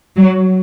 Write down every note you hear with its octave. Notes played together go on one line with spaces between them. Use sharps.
F#3